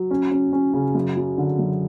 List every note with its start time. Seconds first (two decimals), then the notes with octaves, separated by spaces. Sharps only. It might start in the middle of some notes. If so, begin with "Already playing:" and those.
Already playing: F#3
0.11 C#4
0.31 C#4
0.52 C#4
0.74 C#3
0.95 F#2
1.17 F#3
1.38 D3
1.59 F#2